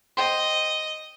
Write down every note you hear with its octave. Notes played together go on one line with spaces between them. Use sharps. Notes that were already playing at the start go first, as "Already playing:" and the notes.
C5 D#5 G5 C6